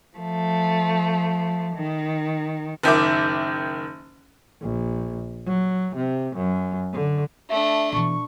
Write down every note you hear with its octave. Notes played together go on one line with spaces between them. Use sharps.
F3 A3
D#3
F#1 D#3 E5 D6
A#1
F#3
C3
F#2
D3
A3 D4 E5
B2 E3 C#6